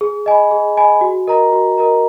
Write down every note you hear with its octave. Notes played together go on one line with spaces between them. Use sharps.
G#4
D#5 G#5 B5
G#4
D#5 G#5 B5
F#4
A#4 D#5 A#5
F#4
A#4 D#5 A#5